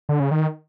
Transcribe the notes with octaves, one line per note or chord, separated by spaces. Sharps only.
D3
C#3
D#3